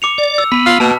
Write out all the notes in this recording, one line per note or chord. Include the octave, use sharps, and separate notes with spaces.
D6 C#7 F7
D5
E6
B3 B5 B6
F4 F6
B2 A#3 A5